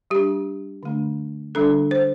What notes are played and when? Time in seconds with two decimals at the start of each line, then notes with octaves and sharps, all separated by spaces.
0.10 G3 D4 G4
0.83 D3 A3 D4
1.55 D3 G3 D4 A4
1.91 C5